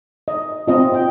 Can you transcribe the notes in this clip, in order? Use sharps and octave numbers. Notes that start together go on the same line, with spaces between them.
D#5
C4 F4 D#5
G5